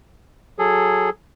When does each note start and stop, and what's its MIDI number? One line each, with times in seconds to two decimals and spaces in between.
0.59 1.09 54
0.59 1.09 68
0.59 1.09 69